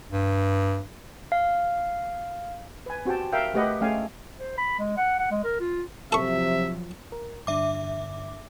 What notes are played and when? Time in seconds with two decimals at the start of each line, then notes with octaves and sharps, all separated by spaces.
0.12 G2
1.32 F5
2.86 B4 G#5
3.05 C4 F#4 G4 G5 A5
3.32 A#4 E5 F5 G5
3.54 G#3 A3 G4 B4 D#5 F#5
3.81 G#3 A3 C#4 F5 G5 G#5
4.40 C5
4.58 B5
4.79 G#3
4.97 F#5
5.19 F#5
5.31 G#3
5.44 A#4
5.60 F4
6.12 C3 F3 F#3 A4 E5 C#6
7.12 A#4
7.47 G2 D3 D4 E5 D6